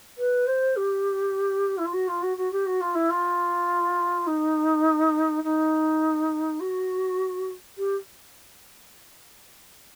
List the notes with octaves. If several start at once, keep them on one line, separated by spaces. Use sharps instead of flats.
B4
C5
G4
E4
F4
F#4
F4
F#4
F#4
G4
F#4
F4
E4
F4
D#4
D#4
F#4
G4